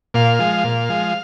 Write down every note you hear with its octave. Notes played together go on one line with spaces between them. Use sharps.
A#2 F5
F3 G#3
A#2
F3 G#3